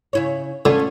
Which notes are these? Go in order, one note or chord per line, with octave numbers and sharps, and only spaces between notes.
C#3 E4 C#5
D3 A3 C#4 F4